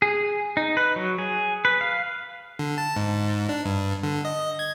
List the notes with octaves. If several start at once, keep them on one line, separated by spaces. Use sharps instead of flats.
G#4
D#4
B4
F#3
G#4
B4
F5
D3
A5
G#2
D4
G2
D3
D#5
G#6